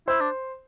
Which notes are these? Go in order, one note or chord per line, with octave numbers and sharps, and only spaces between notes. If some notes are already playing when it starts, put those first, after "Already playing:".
E4 C5
D4